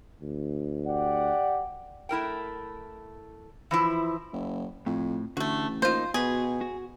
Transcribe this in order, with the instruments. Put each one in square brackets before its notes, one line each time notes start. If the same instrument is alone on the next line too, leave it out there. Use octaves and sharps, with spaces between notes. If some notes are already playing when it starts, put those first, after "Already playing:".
[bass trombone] D2
[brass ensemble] G4 D5 F#5
[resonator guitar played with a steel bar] A3 E4 A#4 G5
E3 F3 E4
[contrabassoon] F#1
[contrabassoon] F2 [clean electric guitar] A2
[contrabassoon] A1 [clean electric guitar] D3 [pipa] A3 F#4
[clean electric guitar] A#3 D#4 [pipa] F4 C5
[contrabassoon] B2 [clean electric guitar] F#4 B4 [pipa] G#4
[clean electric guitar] F#4